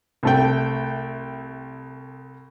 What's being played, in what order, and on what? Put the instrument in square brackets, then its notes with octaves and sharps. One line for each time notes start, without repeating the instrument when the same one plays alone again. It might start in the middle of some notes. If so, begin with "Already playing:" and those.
[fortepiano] C2 A3 G5